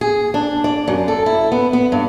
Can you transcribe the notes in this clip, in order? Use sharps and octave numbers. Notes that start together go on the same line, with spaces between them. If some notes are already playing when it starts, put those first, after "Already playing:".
G#4
D4
D5
F#2
A4
E4
B3
B3
G2